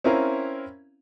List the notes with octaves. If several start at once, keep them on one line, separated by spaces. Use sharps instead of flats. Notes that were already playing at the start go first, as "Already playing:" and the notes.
C4 C#4 E4 A#4 F5